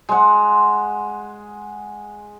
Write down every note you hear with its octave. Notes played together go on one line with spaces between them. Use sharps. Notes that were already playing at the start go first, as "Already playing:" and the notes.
G#3 F#5